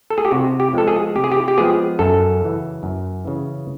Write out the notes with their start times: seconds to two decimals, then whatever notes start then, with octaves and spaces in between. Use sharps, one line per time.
0.10 A4
0.18 G#4
0.25 G4
0.31 C3 F#4
0.60 G4
0.73 F3 G#3 B3 A4
0.88 G#4
1.15 C3 G4
1.24 G#4
1.32 G4
1.48 G4
1.57 F3 G#3 B3 G#4
1.99 F#2 A4
2.41 C#3 E3
2.83 F#2
3.25 C#3 E3